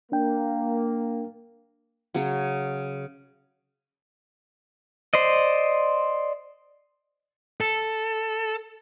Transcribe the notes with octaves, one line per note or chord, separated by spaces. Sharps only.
A#3 D4 G5
C#3 F#3
C5 D5 D#5
A4